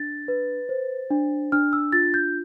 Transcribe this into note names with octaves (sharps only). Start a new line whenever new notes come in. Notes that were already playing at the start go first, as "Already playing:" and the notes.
Already playing: D4 A6
B4
C5
D4
D4 F6
E6
F4 A6
G6